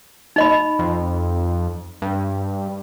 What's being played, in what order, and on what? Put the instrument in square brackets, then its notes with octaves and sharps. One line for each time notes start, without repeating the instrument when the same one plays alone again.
[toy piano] D#4 D#5 B5
[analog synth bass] F2
G2